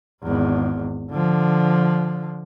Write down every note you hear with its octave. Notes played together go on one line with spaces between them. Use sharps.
G#1 E2
D3 F3